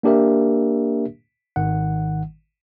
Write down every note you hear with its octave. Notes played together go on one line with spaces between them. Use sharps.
A#3 D4 G4 A#4 E5
G#1 D#3 F#5